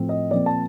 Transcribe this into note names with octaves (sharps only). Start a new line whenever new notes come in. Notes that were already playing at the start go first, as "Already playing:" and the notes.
Already playing: A2 F3 C4
D#5
A#2 F3 C4 D5
A5